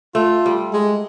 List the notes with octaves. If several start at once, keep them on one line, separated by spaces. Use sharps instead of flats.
A3 F4
G3
G#3